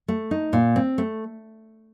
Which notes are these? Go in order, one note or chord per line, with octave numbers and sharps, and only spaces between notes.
A3
D#4
A#2
C4
A3